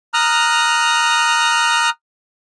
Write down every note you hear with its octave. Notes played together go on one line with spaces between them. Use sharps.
A#5 D#6 F6 F#6